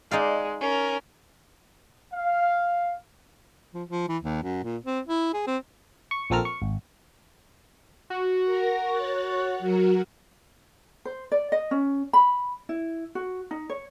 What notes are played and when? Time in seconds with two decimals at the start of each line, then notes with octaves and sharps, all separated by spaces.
0.11 G#3 D#4 D5 F5
0.61 C#4 A#4
2.14 F5
3.74 F3
3.88 F3
4.08 E3
4.22 D#2
4.43 F#2
4.63 A#2
4.85 C4
5.06 E4
5.34 G#4
5.47 C4
6.11 C#6
6.30 A#1 F3 C4 A4 A#4 F6
6.45 C#6
6.62 G#1
8.10 F#4
8.45 A#4 A#6
8.91 C#5 F#6 A6
9.59 F#3 F#4 A#4
11.05 C5
11.32 D5
11.52 D#5
11.71 C#4
12.13 B5
12.69 E4
13.15 F#4
13.51 D#4
13.69 C#5